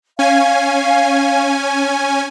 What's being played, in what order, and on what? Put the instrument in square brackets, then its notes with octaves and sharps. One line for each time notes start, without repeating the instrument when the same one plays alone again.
[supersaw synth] C#4 G#5 [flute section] F5